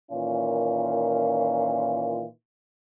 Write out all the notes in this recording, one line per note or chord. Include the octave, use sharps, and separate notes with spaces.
A#2 D#3 E3 C#4 F4